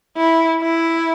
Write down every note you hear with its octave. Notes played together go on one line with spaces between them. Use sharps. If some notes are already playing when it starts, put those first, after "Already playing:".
E4
E4